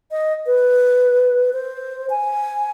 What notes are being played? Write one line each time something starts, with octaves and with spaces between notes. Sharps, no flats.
D#5
B4
C5
G#5